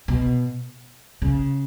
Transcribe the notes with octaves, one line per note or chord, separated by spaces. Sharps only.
B2
C#3